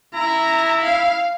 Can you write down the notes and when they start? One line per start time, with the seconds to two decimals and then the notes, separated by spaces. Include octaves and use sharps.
0.15 E4 A#5
0.82 F5